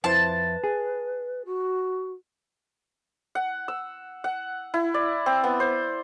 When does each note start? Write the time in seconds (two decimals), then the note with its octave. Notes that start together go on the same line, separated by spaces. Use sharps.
0.04 F2 E4 B4 C5 A5
0.64 G#4
1.45 F#4
3.35 F#5
3.68 E6
4.24 F#5
4.74 E4
4.94 D5
5.26 C4
5.44 B3
5.60 C5